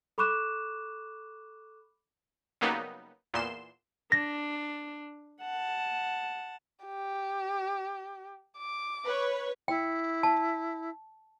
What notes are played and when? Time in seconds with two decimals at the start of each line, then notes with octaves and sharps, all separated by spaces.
0.18 A4 B5 C#6 D6 F#6 E7
2.61 C#3 F#3 G3 A#3 B3 D#4
3.34 E2 A#2 C6 E7
4.12 D4 A#6
5.42 F#5 A5
6.85 G4
8.58 D6
9.05 B4 C#5
9.68 E4 G5
10.23 A5